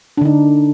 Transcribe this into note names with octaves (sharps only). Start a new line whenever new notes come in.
D3 D4 D#4